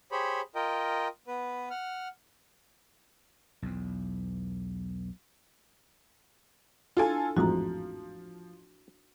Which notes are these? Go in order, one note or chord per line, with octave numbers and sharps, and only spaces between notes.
G4 G#4 C5 C#5 B5
F4 A#4 D#5 G5
B3 B4
F#5 F6
B1 E2
D4 E4 F4 A4 G#5
A1 F2 G#2 F3 F#4 A#5